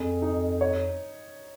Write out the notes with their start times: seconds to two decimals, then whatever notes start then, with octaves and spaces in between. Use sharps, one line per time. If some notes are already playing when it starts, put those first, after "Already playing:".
Already playing: F2 G#4
0.22 D#4
0.61 C#5